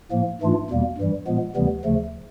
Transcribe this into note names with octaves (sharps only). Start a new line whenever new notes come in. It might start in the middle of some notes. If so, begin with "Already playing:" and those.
A2 F3 A#3
G#2 E3 A3 D4 F4
E2 B2 G3 A#3
G2 E3 G3
A#2 F3 G#3 B3
D2 C3 E3 G3 B3
D2 C#3 F3 A3